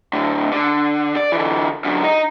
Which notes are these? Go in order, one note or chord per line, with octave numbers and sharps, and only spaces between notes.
A2 D3
D3
D5
D3 E3
F#2 D3
D#4